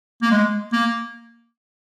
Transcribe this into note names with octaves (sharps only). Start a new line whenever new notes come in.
A#3
G#3
A#3